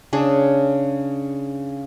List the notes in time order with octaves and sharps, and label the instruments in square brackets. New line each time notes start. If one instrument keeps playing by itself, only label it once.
[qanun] C#3 D4 G#4